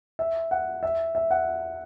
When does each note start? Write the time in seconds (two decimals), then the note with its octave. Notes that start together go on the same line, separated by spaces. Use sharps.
0.19 E5
0.51 F#5
0.83 E5
1.15 E5
1.31 F#5